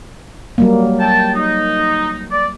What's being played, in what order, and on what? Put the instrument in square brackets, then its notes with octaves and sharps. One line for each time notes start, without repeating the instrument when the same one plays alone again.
[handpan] F#3 G3 A#3
[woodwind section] G5 A5
D#4
D5